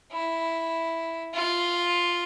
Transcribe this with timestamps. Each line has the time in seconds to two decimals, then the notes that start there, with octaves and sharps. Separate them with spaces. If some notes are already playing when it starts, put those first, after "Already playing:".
0.12 E4
1.34 F4